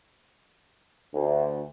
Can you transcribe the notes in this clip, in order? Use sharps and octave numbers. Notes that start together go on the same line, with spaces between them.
D2